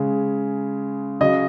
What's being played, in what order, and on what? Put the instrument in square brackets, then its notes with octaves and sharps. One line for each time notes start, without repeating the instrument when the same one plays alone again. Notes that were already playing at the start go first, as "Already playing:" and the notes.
Already playing: [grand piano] C#3 G#3
C#3 F#3 D#5